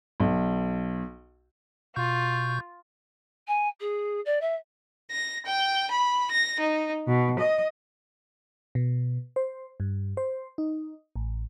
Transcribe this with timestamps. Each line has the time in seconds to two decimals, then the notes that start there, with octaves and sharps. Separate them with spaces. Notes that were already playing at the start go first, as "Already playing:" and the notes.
0.20 B1
1.96 B2 F4 C#6 G6
3.47 G#5
3.80 G#4
4.25 D5
4.41 E5
5.11 A#6
5.46 G5
5.90 B5
6.30 A#6
6.60 D#4
7.07 B2
7.38 D#5
8.75 B2
9.36 C5
9.80 G2
10.17 C5
10.58 D#4
11.16 A1